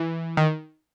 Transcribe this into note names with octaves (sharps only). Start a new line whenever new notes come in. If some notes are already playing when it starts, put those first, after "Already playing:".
Already playing: E3
D#3